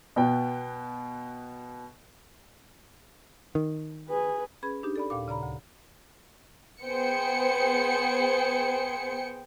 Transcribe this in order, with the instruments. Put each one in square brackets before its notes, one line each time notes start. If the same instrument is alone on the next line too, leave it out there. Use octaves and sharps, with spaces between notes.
[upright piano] B2 B3 G5
[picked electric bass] D#3
[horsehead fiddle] G#4 B4
[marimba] C#4 G#4 B4 B5 G#6
D4 D#4 G4
A4 D5 B5
D#2 A#2 F5 D6
C#3 D5 A#5 B5
D2
[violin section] B3 G#4 C5 G5 C#7